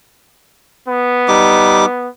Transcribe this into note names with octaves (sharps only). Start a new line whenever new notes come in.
B3
G3 D#4 D6